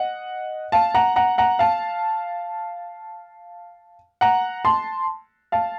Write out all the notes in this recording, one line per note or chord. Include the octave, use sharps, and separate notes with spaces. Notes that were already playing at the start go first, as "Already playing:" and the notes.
Already playing: D#5 F#5
F5 A5
F#5 A#5
F#5 A#5
F#5 A#5
F5 A5
F#5 A#5
A5 C6
F5 A5